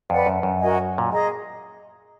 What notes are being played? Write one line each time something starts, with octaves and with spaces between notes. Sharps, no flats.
F2 B4 D5 F#5
F#2
F#2
F#4 A#4 D#5 G#5
A#2
G#4 D#5 A#5